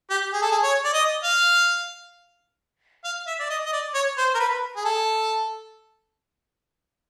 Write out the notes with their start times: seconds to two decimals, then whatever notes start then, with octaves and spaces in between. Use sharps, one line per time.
0.10 G4
0.33 G#4
0.42 A4
0.51 G#4
0.63 C#5
0.84 D5
0.94 D#5
1.24 F5
3.04 F5
3.27 E5
3.39 D5
3.50 D#5
3.66 D#5
3.73 D5
3.94 C#5
4.18 C5
4.35 A#4
4.40 B4
4.76 G#4
4.85 A4